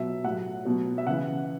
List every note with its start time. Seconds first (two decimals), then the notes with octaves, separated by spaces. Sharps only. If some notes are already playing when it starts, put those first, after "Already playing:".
Already playing: B2 F#3 E5
0.24 A2 F#3 F#5
0.65 B2 F#3
0.98 E5
1.07 C#3 E3 F#5